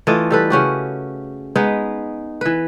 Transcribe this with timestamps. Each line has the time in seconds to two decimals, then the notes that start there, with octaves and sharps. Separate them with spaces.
0.07 E3 A3 F4 D#5
0.30 G3 A4 B4
0.50 C#3 C#4 F#4 G4
1.56 G#3 B3 D#4 B4
2.41 E3 B4